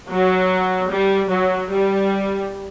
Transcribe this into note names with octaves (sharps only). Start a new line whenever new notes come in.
F#3
G3
F#3
G3